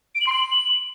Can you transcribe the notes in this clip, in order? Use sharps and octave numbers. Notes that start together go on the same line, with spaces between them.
D7
F#7
C6
F#7